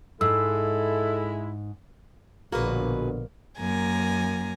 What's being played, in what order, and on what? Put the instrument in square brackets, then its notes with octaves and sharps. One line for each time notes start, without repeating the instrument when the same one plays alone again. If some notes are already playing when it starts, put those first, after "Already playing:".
[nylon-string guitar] G#2 [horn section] G#3 E4 [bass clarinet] A4 [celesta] E6
[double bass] A#1 [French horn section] B2 D3 [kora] A#3 [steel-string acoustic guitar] F#4 G#4 B4
[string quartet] F#2 A#3 G#5 A#5